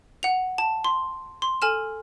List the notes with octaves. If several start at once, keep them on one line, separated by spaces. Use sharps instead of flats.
F#5 F7
A5
C6
C6
A4 G#5 F6 E7